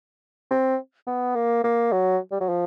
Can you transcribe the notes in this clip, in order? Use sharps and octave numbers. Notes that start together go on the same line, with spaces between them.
C4
B3
A#3
A#3
F#3
G3
F#3
F3